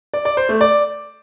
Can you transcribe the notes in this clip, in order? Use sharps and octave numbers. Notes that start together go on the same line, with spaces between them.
D5
D5
C5
A3
D5